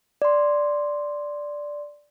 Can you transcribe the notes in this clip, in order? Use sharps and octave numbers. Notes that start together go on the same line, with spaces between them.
D5 C6